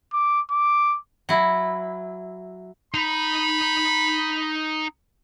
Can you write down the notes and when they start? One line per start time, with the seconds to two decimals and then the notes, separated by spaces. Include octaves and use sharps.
0.13 D6
0.50 D6
1.29 F#3 E4
2.94 D#4 A#5 B5